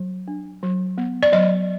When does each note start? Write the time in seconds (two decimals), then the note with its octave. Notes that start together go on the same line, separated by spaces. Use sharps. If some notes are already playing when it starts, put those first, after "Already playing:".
Already playing: F#3
0.28 D4
0.63 F#3
0.98 B3
1.23 D5
1.32 F#3 D#5